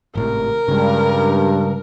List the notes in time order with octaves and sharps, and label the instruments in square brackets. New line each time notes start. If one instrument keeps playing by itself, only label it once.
[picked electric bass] G#1 A2 C3 [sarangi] A#4
[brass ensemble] G2 [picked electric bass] C#3 G#3